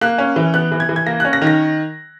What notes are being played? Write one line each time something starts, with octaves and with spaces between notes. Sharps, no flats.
A#3 F#6
C#4
E3
B3 F#6
E3
G#6
E3
G#6
A#3 A#6
F#6
C#4
A#6
D#3
A#6